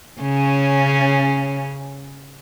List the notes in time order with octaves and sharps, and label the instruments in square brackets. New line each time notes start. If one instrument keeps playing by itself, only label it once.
[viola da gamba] C#3 C#4